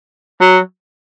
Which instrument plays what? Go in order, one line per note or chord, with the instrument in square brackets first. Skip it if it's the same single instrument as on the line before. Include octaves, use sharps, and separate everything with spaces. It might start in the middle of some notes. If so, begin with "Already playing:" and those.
[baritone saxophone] F#3